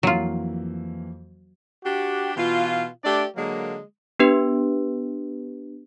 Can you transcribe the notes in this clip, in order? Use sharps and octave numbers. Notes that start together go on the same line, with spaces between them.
F2 E3 F#3 A#3 F4
D4 F#4 G4
B2 E3 F4
A3 D4 G4 D5
D3 F#3 G#3 A#3
B3 D4 G4 B4